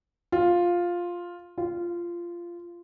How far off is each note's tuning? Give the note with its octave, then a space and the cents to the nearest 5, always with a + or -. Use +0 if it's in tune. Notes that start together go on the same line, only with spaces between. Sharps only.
F4 +5
F4 -15